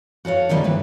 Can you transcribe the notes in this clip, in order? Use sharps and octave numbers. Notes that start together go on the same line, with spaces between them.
F#4 A4 C#5 F5
C3 D#3 F3 G3 A#3 D#4
D2 G2 A3 B4